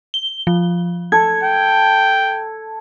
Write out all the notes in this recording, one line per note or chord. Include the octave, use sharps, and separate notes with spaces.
G7
F3
A4 G#6
G5